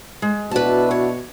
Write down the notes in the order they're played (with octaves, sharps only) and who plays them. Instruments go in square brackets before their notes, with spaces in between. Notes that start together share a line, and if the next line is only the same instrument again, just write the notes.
[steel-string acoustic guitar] G#3
[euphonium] B2 [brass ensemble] D4 E4 F#4 [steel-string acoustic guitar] B4 A5
[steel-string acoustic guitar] C#5